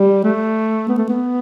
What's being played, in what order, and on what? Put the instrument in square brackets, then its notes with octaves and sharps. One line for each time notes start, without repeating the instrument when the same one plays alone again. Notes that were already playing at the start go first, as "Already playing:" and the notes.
Already playing: [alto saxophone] G3
A3
B3
A3
B3